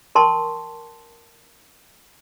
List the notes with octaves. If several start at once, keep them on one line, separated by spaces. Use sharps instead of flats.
A#4 G5 A5 C6 C#6